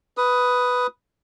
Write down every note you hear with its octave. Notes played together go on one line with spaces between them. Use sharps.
B4 D#6